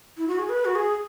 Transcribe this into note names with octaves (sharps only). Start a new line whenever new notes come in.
E4
F#4
G#4
B4
F#4
G#4